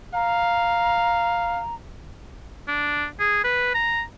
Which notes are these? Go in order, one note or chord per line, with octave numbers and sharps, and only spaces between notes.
F5 A#5
D4
G#4
B4
A#5